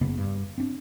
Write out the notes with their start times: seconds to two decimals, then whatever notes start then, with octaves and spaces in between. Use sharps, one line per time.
0.01 F#1 C#3 A#3 B3
0.18 G2
0.58 C4 D4